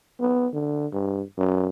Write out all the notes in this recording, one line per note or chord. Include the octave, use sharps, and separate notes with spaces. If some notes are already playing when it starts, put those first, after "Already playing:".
B3
D3
G2
F#2